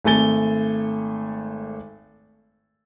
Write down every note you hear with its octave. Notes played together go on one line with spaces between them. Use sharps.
G#1 A3 A4 G#5 A6 G7